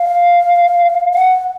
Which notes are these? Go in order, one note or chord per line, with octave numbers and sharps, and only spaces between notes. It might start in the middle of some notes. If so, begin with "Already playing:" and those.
Already playing: F5
F#5